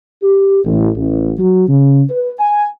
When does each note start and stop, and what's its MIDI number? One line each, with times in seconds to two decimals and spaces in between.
0.23 0.60 67
0.65 0.90 33
0.96 1.32 33
1.38 1.68 54
1.69 2.02 49
2.10 2.33 71
2.39 2.65 80